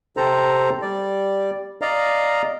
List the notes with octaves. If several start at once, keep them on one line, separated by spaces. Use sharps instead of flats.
C3 C4 A4 C5 A#5
G3 D5
D5 D#5 F5 A#5